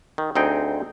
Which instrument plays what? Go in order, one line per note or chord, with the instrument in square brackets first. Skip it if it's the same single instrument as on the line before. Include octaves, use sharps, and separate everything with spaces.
[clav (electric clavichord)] D#3
D2 C4 D#4 G#4 G5